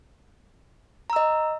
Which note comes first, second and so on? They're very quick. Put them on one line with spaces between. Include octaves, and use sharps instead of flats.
A#5 E6 D#5